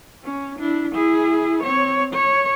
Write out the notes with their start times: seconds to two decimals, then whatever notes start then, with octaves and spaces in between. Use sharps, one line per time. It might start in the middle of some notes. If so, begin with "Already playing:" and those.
0.24 C#4
0.60 D4 E4
0.93 E4 G#4
1.63 C4 C#5
2.14 C#5